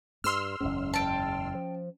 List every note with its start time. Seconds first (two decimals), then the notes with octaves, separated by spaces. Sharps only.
0.24 G2 C6 E6 F6
0.61 F#1 E2 G#2 C#4
0.94 G5 A5
1.55 F3